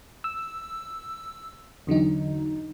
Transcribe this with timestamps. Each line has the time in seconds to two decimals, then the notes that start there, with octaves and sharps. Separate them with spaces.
0.24 E6
1.87 E2 D3 F#3 D#4